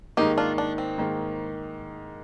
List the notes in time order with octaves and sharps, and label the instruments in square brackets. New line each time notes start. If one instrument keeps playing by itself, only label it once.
[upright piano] G#2 D#3 A#3 [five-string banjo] D#4 G4
[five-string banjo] D4 F4
D4
C4
[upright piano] G#2 D#3 A#3